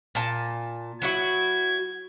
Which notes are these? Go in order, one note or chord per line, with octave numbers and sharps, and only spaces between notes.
A#2 A5
F#3 E4 F#4 G#6